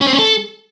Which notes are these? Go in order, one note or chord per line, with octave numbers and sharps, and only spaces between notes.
C#4
C4
C#4
A4